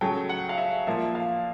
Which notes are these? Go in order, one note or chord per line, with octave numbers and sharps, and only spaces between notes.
C#3 F#3 A3 G5
F#5
F5
E5
A#2 F3 A#3 E5
F5